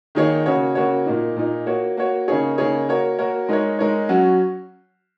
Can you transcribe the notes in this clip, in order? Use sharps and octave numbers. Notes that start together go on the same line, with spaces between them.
D#3 A#3 D#4 G#4 C#5
C#3 A#3 F#4 C#5
C#3 A#3 F#4 C#5
A#2 A#3 D#4
A#2 A#3 D#4
A#3 F#4 C#5
A#3 F#4 C#5
C#3 A#3 D#4 G#4 C#5
C#3 A#3 D#4 G#4 C#5
A#3 F#4 A#4 C#5
A#3 F#4 A#4 C#5
G#3 D#4 A#4 C#5
G#3 D#4 A#4 C#5
F#3 C#4 F#4